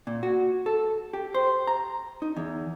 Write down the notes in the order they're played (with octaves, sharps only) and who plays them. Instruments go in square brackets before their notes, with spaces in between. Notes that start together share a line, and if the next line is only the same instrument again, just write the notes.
[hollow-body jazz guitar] A#2
F#4
A4
G4
C5
A#5
D#4
E2